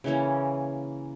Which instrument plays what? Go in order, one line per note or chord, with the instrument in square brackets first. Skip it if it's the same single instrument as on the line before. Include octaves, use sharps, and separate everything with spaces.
[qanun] C#3 E3 A#3 C#4